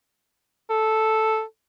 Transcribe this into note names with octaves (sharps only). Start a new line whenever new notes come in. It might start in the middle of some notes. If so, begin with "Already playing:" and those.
A4